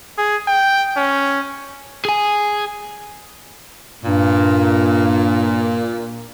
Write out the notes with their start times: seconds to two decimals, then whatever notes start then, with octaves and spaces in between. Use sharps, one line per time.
0.18 G#4
0.48 G5
0.97 C#4
2.05 G#4 G#5
4.04 G2 A#2